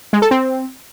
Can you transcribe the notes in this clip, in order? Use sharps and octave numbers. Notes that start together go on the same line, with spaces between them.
G#3
A4
C4